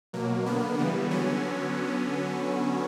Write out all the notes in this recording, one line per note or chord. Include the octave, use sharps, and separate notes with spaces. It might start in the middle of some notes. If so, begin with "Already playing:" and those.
B2 F#3 A#3
D3 A#3 B3
C#3 E3 G3 B3
D3 F#3 B3 C#4